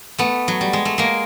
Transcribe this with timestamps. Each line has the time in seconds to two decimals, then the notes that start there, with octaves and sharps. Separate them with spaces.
0.19 A3 B3
0.48 F#3
0.61 G3
0.73 G#3
0.85 A3
0.98 G#3 A#3